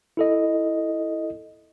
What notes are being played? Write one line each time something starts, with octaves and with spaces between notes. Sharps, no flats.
E4 A4 D#5